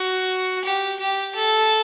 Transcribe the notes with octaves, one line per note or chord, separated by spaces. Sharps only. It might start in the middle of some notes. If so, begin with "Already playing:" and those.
Already playing: F#4
G4
G4
A4